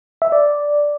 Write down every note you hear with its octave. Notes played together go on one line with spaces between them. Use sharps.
E5
D5